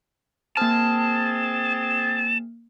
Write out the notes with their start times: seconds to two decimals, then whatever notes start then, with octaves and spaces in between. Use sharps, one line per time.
0.57 A#3 C4 G#4 A5 F6